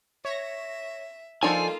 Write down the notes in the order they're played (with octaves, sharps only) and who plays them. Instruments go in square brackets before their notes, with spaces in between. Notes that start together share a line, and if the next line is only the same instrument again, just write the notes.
[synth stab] C#5 A#6 [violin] E5
[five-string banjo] F3 D4 A5 [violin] A#3 F4 [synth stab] D#4 A4 [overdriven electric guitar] G#5